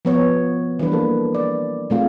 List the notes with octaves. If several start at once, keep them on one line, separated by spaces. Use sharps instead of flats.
F3 B3 C#5
E3 G3 D4 B4
A#3 A4
D5
A#2 G#3 A3 C4 F4